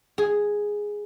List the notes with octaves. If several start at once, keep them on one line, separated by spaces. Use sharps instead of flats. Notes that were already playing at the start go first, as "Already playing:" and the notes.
G#4